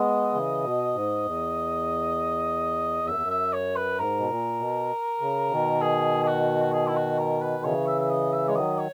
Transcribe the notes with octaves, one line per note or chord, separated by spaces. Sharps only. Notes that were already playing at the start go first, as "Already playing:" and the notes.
Already playing: G#3 B3 D#5
C#3 E3
B2
G#2
E2
F#2 E5
E2
F#2
E5
C#5
B4
G#2 A#4
B2
A#2
B2
C#3
B2 D#3
G#4
G#4
F#4
F#4
G#4
E4
F#4
A#4
B4
C#3 E3 C#5
E5
E5
D#5
E5
G#3 C#5
D#3 F#3 D#5
C#5